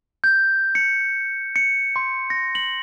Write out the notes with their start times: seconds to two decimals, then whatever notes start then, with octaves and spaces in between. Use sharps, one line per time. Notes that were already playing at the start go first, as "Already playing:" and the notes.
0.24 G6
0.75 C#7
1.56 C#7
1.96 C6
2.30 A#6
2.55 F#7